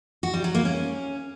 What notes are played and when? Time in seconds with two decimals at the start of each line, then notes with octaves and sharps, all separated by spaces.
0.23 F#4
0.34 G3
0.44 F#3
0.55 A#3
0.65 C#4